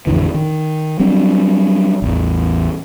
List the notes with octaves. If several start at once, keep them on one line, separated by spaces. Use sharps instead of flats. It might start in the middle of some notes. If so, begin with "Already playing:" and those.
A1 F2 D3 E3
D#3
F#3 G3 C4 D4
A1 E2